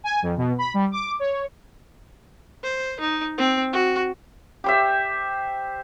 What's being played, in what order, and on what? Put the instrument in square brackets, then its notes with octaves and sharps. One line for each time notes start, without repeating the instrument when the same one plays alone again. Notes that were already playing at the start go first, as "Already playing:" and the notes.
[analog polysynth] G#5
F2
B2
B5
G3
D6
C#5
[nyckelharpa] C5
D#4
C4
F#4
[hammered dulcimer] G4 C5 E5